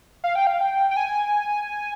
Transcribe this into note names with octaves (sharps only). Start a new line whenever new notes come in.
F5
G5
F5
G5
G5
G#5